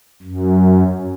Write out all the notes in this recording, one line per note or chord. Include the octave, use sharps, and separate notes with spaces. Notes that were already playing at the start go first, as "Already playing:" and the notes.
F#2